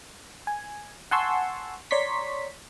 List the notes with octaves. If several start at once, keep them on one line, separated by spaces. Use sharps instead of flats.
G#5
F#5 G#5 A5 C6 C#6 E6
C#5 D5 A#5 C6 C#6 B6